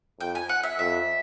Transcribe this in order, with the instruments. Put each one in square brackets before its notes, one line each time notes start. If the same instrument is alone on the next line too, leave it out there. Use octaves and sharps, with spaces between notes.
[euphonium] F2 [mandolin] G5
[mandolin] G#5
F#5
E5
[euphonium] F2 [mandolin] E5